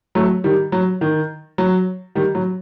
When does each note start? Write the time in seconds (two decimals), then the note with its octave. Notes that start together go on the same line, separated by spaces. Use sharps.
0.15 F#3 A3
0.44 D#3 G3
0.72 F#3
1.01 D#3
1.58 F#3
2.15 D#3 G3
2.35 F#3